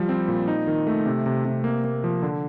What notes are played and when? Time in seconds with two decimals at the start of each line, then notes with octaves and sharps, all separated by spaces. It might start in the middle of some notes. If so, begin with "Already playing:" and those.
Already playing: F3 G3
0.09 C4
0.28 A#2
0.48 D#4
0.67 D#3
0.87 A3
1.06 C3
1.26 C3
1.45 C3
1.64 A#3
1.84 A#3
2.04 F3
2.23 D3